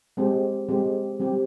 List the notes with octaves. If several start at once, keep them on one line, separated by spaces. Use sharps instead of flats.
G#3 C4 G4
G#3 C4 G4
G3 C4 G4